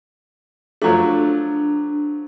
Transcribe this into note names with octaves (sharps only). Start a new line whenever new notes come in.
F3 F#3 A3 D4